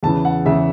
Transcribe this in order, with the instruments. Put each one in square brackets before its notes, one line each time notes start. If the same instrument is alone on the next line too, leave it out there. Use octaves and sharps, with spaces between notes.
[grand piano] E2 C#3 E3 A5
F#5
E2 C#3 E3 E5